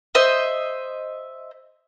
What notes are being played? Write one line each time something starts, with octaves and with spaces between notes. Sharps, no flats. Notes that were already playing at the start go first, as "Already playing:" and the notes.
C5 D#5 E5